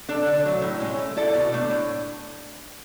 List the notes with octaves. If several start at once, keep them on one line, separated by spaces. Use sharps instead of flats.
D4 A4 D5
D3
F#3 A3
A2
G#3 C#4
A3
E4 A4 D5
B2
A3 D4
A2